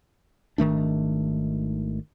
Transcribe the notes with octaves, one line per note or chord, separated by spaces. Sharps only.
G#1 D#3 A3 D4